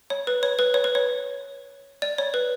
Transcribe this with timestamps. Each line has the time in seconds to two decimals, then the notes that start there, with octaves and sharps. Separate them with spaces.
0.10 C#5
0.27 B4
0.43 C#5
0.59 B4
0.74 C#5
0.84 B4
0.95 C#5
2.02 D5
2.18 C#5
2.34 B4